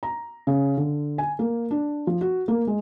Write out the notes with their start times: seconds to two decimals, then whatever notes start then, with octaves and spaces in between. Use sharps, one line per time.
0.03 A#5
0.47 C#3
0.78 D3
1.18 G#5
1.39 A#3
1.71 D4
2.07 F3
2.21 F#4
2.48 A#3
2.67 G#3